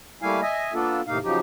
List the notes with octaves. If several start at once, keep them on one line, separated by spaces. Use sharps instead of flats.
G3 A3 A#3 E4 F5 G#5
D#5 E5 G#5
A#3 B3 D4 F4 A4
D#2 A2 C3 A#3 D#4 F5
C#3 F3 F#3 D#4 G4